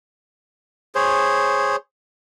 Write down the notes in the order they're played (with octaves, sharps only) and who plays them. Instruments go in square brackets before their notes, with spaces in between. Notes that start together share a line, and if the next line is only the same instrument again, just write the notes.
[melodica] G#4 C5 C#5